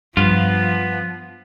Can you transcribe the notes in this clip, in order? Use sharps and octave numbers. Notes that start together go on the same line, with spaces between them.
G2 F3 B3 F4